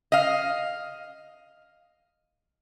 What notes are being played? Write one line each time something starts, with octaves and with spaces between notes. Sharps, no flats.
D#5 F5